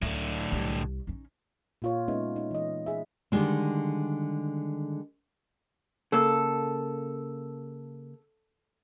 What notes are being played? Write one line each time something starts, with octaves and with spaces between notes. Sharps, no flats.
C#2 A2 D3
C2
C#4 D#4
A#2 F4 C#5
G#3 B3 C#4 D#4 E5
D#4
E3 D#5
G#4 E5
D3 D#3 G3 G#3 C4
C#3 A#3 A4